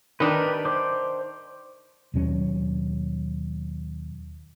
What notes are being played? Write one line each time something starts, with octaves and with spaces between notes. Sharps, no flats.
D#3 D4 G4 A#4 B4
C5 D6
D#2 B2 F#3 C#4